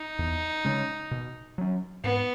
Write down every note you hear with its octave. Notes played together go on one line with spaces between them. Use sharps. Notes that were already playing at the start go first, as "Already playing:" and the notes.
Already playing: D#4
E2
C#3 G#3 C#4
B2
F#3 C#4
G#2 B3